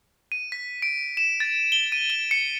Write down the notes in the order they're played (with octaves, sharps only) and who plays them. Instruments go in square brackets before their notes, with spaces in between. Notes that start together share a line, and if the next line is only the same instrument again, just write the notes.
[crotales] D#7
B6
D7
E7
A6
G7
D#7
G7
C#7